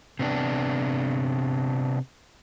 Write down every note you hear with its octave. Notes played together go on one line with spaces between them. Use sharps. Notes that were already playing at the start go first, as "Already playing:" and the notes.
C3 B3 D4